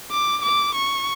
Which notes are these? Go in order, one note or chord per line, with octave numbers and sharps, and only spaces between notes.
D6
D6
C#6